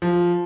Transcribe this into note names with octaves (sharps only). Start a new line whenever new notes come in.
F3